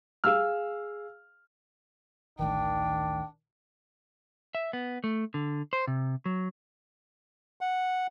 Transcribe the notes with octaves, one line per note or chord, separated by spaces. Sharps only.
G#4 F5 E6 F6
A1 D2 D#3 D4 G5
E5
B3
A3
D3
C5
C3
F#3
F#5